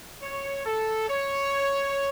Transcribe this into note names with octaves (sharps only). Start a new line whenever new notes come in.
C#5
A4
C#5